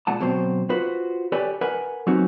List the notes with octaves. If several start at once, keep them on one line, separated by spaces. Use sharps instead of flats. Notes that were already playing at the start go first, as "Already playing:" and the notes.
A#2 G#3 F#5 A5
D2 B2 F#3 C4 C5
F4 F#4 B4 C5
G4 A4 B4 C#5 D5 G#5
A#4 B4 F#5 G#5
F#3 A#3 C4 C#4 D#4 F#4